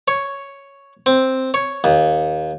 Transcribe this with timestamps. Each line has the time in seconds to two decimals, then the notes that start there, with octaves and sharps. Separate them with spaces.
0.08 C#5
1.06 C4
1.54 C#5
1.84 D#2